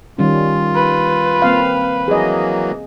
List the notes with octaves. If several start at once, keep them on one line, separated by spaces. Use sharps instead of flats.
D#3 G3 C#4 F4
B4
A#3 C4 F5
E3 F#3 A#3 G#4 D#5